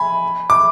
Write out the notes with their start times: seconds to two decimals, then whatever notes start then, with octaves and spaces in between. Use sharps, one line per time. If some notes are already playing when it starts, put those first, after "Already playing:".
Already playing: G#5 B5
0.50 D6